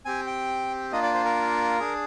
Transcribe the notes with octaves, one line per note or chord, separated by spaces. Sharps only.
C4 G4 G#5
G5
A#3 D4 F4 D#5
D5
C5
A#4
D4 G#4